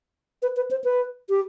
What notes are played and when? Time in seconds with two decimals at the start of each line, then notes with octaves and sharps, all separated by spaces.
0.42 B4
0.56 B4
0.71 C5
0.84 B4
1.30 G4